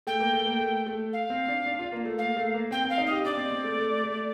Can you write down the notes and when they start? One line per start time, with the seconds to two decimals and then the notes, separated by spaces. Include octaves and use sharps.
0.07 A3 G5
0.20 A#3
0.33 A3
0.46 A#3
0.60 A3
0.87 A3
1.13 F5
1.30 C4
1.48 D4
1.66 D4
1.79 F4
1.92 A#3
2.05 A3
2.18 A#3 F5
2.37 A3
2.54 A#3
2.71 C4 G5
2.85 C4 F5
2.98 D#4
3.06 G4 D#5
3.24 D4 D5
3.37 C4
3.51 C4
3.64 A3
3.78 A3
4.04 A3